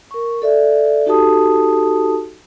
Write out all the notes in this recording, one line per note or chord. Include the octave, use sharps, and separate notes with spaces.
A#4 C#6
A4 D5 E5
D#4 F#4 G4 A4 A5 D#6